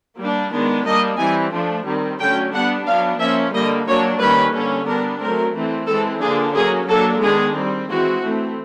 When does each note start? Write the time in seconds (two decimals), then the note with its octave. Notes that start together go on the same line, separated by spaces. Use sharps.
0.19 G3 A#3 D4
0.53 D#3 G#3 B3 D4
0.86 G3 A#3 D4 D#5
1.19 E3 G3 C4 G#5
1.53 F3 A3 D4
1.87 D#3 G3 C4
2.20 D3 F#3 A3 C#4 G5
2.53 G3 B3 D4 F#5
2.87 F#3 B3 D4 F5
3.20 F3 A#3 C#4 E5
3.54 D3 G3 A#3 D#5
3.87 F#3 A#3 D4 C#5
4.20 D#3 G3 A#3 C#4 B4
4.55 D3 G3 A#3 C#4
4.88 G3 B3 D4 A#4
5.21 F#3 A3 C4 A#4
5.54 E3 A3 C4
5.88 E3 G#3 C4 A4
6.22 D3 F3 A#3 D4 G#4
6.55 F#3 A#3 C#4 G#4
6.88 F#3 A#3 D4 A4
7.22 D#3 G#3 B3 D4 G#4
7.55 C4
7.61 G3
7.88 E3 G#3 C4 F#4
8.23 E3 A3 C4